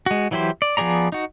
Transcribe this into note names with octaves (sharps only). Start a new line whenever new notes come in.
G#3 F#4
E3 F#3 E4 G4 C5
D5
F3 B3 G#4 D5 A#5
D#4 F#4